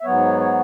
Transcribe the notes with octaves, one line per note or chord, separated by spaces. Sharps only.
E5
G#2 F#3 B3 C#5
C#5